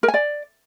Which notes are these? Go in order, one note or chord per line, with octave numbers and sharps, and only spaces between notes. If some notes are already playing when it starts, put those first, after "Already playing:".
A#4
G#5
D5